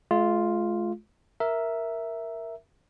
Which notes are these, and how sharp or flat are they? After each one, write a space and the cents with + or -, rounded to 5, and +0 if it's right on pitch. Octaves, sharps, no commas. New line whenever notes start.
G#3 +45 F4 +0
A#4 +0 E5 +0